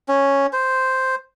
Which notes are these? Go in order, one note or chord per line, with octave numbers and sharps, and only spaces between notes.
C#4
C5